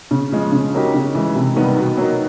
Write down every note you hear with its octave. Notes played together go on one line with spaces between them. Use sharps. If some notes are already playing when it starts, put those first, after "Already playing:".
C#3
F3 G#3
C#3
F#3 A#3 D#4 G4
C#3
E3 G#3
C3
D#3 G3 B3 D#4
B2
F#3 A#3 D#4